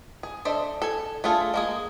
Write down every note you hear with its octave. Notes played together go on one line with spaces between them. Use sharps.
G#4
D4 A4 C5 D#5 E5
A4 G#5
A3 D4 F4 G#4 A4
G#3 A#3 G#4